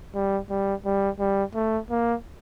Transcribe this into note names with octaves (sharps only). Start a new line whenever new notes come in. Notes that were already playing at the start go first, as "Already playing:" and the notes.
G3
G3
G3
G3
A3
A#3